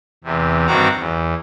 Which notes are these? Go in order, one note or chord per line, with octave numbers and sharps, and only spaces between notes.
E2 C3
G2 D#3 C4 F#4 A#5 D6
E2